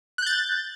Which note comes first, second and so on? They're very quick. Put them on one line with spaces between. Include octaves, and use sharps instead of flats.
F#6 G6 A6